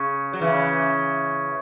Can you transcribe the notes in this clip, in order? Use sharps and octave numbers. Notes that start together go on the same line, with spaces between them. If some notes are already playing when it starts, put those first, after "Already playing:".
Already playing: C#3
F#3
C#3 E3